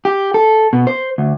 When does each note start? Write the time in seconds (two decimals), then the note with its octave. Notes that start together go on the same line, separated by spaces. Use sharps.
0.05 G4
0.34 A4
0.73 B2
0.87 C5
1.18 D2